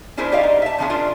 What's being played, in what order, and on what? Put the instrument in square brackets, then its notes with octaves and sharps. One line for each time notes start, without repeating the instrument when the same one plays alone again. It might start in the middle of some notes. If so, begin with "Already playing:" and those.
[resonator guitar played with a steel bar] C#4 D4 E4 G#4 A#4 C5
E4 G4 D5 D#5 F5
D#4
E5 A5
B2 D3 F3 C#4 D4 G#4
D4 F4 G#4 A#4